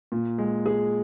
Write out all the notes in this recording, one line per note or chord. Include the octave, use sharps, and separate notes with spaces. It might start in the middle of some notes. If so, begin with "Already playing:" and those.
A#2
G#3
G#4